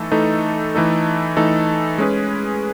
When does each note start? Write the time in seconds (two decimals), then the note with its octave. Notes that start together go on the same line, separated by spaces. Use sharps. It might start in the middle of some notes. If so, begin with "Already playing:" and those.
Already playing: E3 A3 D#4 A4
0.12 E3 A3 D#4 A4
0.75 E3 A3 D#4 A4
1.37 E3 A3 D#4 A4
1.98 G#3 C#4 G#4 B4